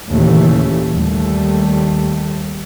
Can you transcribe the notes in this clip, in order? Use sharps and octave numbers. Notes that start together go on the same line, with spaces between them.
D#2 A#2 C#3 E3 A3
D#2 G3 A3